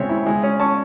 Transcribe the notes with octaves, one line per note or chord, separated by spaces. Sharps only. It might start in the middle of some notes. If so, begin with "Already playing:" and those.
Already playing: C#3 G#3 C4 C#5 E5
E4
G#3
C#4
C#4 A5 C#6